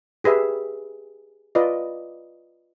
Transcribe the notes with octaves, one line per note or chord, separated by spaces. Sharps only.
G4 G#4 B4 E5
F4 B4 D5 D#5